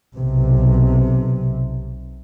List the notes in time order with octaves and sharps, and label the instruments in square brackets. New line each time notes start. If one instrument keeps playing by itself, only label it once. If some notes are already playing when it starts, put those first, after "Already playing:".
[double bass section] B1 C3